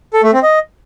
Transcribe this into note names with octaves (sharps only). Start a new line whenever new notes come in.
A4
A3
C4
D#5